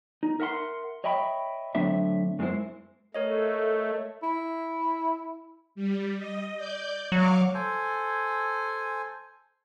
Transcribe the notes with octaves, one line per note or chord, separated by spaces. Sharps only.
D#4
A#4 E5 F#5 B5 C6
C#5 D#5 E5 G5 B5
A2 D3 F#3 C4 D4 E5
F#2 G#3 C4 C#4 E4 C5
A3 A#4 C#5 D#5
E4
G3
D#5
D5 G6
F#3 F5 C#6 D6
A4 C5 G#5